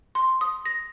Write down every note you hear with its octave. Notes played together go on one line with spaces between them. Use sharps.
C6
D#6
A#6